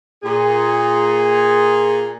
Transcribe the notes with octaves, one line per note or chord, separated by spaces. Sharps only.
A#2 G#4